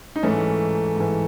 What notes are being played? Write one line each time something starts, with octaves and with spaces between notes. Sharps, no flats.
D#4
G#2 E3 A3 C#4
G#2 E3